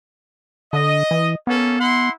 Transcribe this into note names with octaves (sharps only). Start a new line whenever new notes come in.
D3 D#5
E3
A#3 B3 C#4 A4
E4 F#5 C6